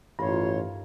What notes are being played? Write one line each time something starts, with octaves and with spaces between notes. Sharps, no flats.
A1 G2 D#3 F4 A4 C#5 C6